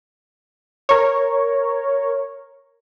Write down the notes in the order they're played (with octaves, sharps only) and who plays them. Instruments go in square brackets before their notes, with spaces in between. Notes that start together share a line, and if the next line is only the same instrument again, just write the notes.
[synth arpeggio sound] A#4 C#5